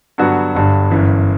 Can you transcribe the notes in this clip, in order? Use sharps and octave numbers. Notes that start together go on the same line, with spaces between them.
G2 D3 F#3 B3 F#4
G1 G2 D3
G1 F#2 E3